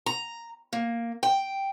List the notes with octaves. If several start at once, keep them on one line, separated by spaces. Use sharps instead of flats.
A#5
A#3
G5